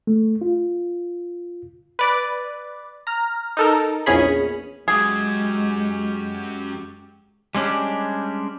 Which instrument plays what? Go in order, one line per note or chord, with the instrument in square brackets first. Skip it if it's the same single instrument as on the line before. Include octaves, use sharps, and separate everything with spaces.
[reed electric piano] A3
F4
[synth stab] B4 D5
A#5 F6
D#4 A4 A#4
A#1 E2 C#4 G#4 B5
[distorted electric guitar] F#2 F#3 [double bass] G#3 [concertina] G4 [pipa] G#4
[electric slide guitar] G3 G#3 C#4 D4 G4